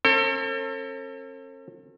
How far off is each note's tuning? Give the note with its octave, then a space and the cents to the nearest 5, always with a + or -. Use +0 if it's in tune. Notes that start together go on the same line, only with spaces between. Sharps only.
C4 +45 A4 +40